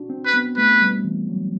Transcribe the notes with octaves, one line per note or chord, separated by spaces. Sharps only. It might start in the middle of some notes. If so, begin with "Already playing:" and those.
Already playing: D4 F#4
C4
B4
B3
A3 B4
G3
E3
F#3